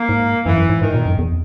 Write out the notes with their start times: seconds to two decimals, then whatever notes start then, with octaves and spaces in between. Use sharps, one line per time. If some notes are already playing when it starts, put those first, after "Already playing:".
Already playing: A#3
0.09 G#2
0.46 F#2 E3
0.57 F#2
0.70 G#2
0.82 G#2 D#3
0.94 A#2
1.06 F#2
1.18 E2